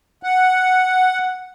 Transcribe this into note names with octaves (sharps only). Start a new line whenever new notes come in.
F#5